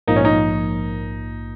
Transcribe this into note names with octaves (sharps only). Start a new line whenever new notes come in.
A#1 G#2 F3 A#3 D#4
C#4
D#4